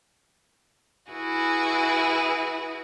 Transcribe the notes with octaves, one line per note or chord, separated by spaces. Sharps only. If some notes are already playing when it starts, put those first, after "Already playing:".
E4 F#4 G#4 B4